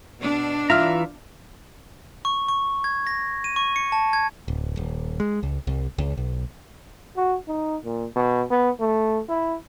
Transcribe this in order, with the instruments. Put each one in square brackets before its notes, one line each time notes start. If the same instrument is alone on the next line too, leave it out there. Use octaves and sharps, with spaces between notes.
[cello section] B2 D4
[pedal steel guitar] E3 A#5 [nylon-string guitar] F4 [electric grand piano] E5 F6
[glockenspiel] C#6
C#6
G#6
A#6
D#7
C#6
C#7
A5
G#6
[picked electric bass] D1
D#1
G#3
C#2
C2
C#2
B1
[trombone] F#4
D#4
A#2
B2
B3
A3
E4